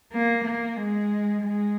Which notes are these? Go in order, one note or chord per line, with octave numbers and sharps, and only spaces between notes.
A#3
A#3
G#3
G#3